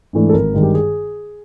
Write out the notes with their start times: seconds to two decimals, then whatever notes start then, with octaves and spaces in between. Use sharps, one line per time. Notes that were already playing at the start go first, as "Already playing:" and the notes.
0.13 G#2 E3 A3 D4
0.29 A4
0.33 G#1 A#4
0.54 G2 D#3 G#3
0.63 G4
0.75 G#4